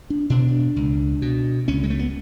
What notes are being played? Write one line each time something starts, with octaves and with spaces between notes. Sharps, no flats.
D4
B2 D4
C#2
B2
C#2 C#4
G#3
A3
B3